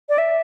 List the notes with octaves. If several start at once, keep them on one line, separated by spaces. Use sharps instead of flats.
D5
E5